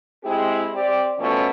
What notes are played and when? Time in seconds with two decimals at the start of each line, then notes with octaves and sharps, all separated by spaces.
0.24 G#3 C4 E4 G4 G#4
0.74 C4 G4 D5
1.18 B2 F3 A3 C#4